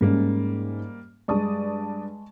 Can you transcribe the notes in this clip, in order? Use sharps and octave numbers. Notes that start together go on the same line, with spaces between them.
G#2 G3 G#3 A#3 C#4
G2 G#3 D5 A5 C#6 D#6